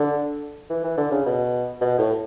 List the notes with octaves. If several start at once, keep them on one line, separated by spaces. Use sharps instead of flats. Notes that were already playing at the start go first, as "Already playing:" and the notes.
Already playing: D3
E3
E3
D3
C#3
B2
B2
A2